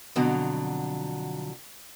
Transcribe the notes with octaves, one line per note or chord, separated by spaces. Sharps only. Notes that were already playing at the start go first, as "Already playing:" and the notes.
F2 B2 D3 F#3